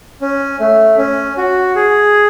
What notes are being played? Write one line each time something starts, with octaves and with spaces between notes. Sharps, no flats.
C#4
A3
C#4
F#4
G#4